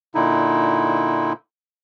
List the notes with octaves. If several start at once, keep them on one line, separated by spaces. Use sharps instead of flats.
A#2 D3 D#4 E4